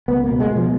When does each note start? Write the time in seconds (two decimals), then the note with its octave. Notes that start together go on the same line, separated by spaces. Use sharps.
0.08 C#2 B3
0.24 A#3
0.30 B2
0.40 G#3
0.51 B2
0.56 F3